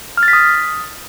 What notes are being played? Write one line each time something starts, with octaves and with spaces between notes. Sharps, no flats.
F6
A6
B6
D#6